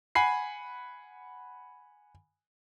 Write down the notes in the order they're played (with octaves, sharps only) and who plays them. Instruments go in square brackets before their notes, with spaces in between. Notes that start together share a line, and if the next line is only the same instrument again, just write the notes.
[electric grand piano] F#5 G#5 B5 C7